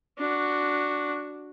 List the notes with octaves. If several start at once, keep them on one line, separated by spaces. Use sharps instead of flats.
D4 F#4